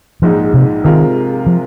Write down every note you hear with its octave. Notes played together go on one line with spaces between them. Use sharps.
A#1 G#2 F3 G#3 D#4
C3
C3 D#3 G#3 F4 A#4
F3